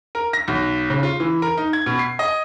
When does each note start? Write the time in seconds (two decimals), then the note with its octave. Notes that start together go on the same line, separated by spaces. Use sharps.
0.15 A#4
0.33 A#6
0.48 B1
0.90 C#3
1.03 F4
1.20 E3
1.42 A#4
1.57 D#4
1.73 G#6
1.86 B2
1.99 C7
2.19 D#5